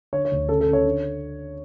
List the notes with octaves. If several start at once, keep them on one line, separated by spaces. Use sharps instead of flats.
D3 C#5
C#5
D2
C#3 A4
A4
C#3
C#5
D3